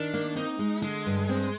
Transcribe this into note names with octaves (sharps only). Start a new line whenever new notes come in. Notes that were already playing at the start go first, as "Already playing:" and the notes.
Already playing: D#3 D4
A#3
C4 D#4
G#3
D3 G#3
G2
C4